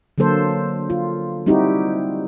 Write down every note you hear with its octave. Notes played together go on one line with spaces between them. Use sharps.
D3 F#3 A#3 A4 C5
F4
G3 C4 D#4 E4 F#4 G4